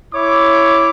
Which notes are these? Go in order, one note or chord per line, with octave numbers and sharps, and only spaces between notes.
E4 C#5 D6